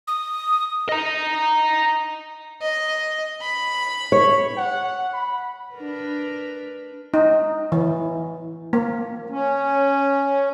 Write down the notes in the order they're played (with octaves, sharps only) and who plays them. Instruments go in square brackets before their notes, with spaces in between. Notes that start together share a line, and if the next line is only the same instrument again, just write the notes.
[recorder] D#6
[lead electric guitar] D#5 A#5
[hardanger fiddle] D#5
B5
[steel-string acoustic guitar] C#5
[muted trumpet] F#5
B5
[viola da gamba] D4 A#4 B4
[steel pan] D#4
E3
A#3
[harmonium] C#4